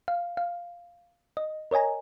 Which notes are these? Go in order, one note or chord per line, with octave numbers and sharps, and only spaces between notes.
F5
F5
D#5
A#4 C#5 D#5 G#5 A#5